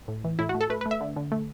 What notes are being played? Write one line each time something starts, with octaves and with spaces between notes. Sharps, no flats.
A2
E3
A2 E4
F#4
A3
A4
A3 B4
B4
A3
E5
D3
D3
A3